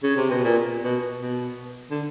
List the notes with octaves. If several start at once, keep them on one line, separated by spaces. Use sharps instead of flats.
C#3
C3
B2
A#2
B2
B2
D3